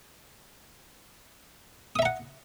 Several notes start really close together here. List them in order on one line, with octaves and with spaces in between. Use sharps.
D#6 E5 A#5 F#5